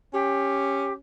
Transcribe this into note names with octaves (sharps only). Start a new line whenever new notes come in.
C#4 G4